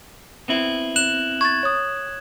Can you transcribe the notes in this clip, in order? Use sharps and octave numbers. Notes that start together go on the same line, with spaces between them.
B3 C4 E4
F#6 E7 F#7
C#6 G#6 A6
C#5 D#6